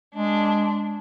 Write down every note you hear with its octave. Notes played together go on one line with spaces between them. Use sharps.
G#3 D4